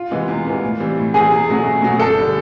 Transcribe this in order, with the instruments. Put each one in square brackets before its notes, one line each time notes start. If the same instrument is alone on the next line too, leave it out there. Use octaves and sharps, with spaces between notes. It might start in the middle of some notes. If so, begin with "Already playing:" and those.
Already playing: [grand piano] F4
[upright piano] C3 E3 G#3 B3
E2
C3 E3 G#3 B3
A2
E3 G3 C4
A2
[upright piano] E3 G3 C4 [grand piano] G#4
[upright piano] E2
B2 F#3 A3
E2
B2 F#3 A3
[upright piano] G1 [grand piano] A4
[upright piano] D3 G3